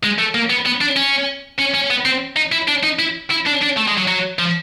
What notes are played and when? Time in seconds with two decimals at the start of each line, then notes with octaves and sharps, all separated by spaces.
0.04 G#3
0.18 A3
0.34 A#3
0.50 B3
0.66 B3
0.81 D4
0.97 C#4
1.58 C#4
1.74 C#4
1.90 B3
2.05 C4
2.36 D#4
2.52 E4
2.68 D4
2.83 D#4
2.99 E4
3.30 E4
3.46 D4
3.61 D4
3.77 A3
3.87 G#3
3.97 F#3
4.08 F#3
4.39 F3